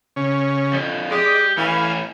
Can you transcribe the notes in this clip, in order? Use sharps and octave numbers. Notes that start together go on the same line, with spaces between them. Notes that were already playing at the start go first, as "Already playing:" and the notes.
C#3 C#4
F2 D3
G#3 G4 D5 D#5
A2 E3 C#4 F5 G#5